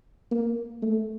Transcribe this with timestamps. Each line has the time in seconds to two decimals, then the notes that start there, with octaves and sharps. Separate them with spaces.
0.31 A#3
0.83 A3